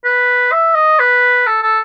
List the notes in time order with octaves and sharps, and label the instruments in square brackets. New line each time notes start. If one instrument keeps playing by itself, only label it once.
[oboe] B4
E5
D#5
B4
A4
A4